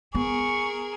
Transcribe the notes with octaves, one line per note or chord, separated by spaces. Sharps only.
B3 G#4 A#4 C#6